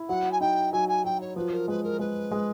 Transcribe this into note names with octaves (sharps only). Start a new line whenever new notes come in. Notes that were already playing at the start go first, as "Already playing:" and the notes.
Already playing: E4
F#3 F#5
G#5
D#4 G5
F#3 G#5
G#5
F#3 G5
C#5
F3 B4
A#4
G#3 B4
A#4
G#3 B4
G#3